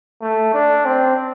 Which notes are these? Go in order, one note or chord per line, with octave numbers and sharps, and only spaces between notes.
A3
D4
C4